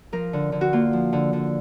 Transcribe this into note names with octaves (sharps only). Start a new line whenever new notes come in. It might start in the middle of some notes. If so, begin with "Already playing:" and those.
F3 A#4
D3
D3
F#4
A#3 F4
F3
D3
D3